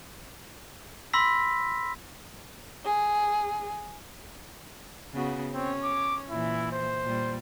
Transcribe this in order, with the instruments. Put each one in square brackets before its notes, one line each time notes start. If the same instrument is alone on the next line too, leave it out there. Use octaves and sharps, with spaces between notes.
[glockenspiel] B5 C6 E6 A#6 B6
[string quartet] G#4
[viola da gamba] C#3 B3 F#4
[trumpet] C4 [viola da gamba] C#4 C#5
[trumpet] D6
[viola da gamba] A#2 E3 [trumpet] E4
[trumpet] C5
[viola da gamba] A#2 G3